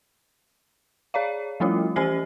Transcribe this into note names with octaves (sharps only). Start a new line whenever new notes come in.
G#4 C#5 D5 F5
F3 G3 A3 C#4 E4 F4
E3 C#4 G4 C5 G#5 C7